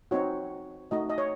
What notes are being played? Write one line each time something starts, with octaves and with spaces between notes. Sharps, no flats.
C4 D#4 F#4 C#5
A3 D#4 F#4 D#5
D#5
C#5